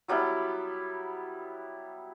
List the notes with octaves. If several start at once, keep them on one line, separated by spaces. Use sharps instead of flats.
F#3 G3 B3 E4